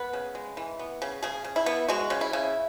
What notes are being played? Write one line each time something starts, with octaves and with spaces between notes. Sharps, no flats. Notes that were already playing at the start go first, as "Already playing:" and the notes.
Already playing: B3 B4
C#3
G#3
E3
B3
C#3
C#3 G#4
C#3
E4
B3
G#3 F#4
C#3
E4
C#3